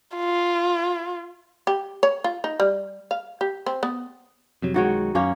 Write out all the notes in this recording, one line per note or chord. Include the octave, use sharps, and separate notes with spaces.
F4
G4
C#5
F4
D#4
G3
F5
G4
C4
B3
F2 C3 F#3
B1 D#3 G#3 F#4 C#5
F#2 A#3 C#4 C#5